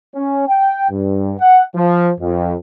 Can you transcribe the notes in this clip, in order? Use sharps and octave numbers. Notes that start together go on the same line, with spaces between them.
C#4
G5
G2
F#5
F3
F2